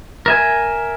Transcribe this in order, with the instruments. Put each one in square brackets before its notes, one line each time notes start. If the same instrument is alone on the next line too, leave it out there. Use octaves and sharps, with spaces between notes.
[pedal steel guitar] A#4 E5 G#5